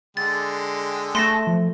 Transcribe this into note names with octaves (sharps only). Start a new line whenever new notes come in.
D3 G#3 G5 A6
A3 C6 A#6 E7
F3